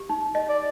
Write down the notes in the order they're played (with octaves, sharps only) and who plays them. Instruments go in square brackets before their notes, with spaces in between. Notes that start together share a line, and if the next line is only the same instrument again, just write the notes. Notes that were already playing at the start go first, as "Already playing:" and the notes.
Already playing: [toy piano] G4
D#4
D#5
[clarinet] D5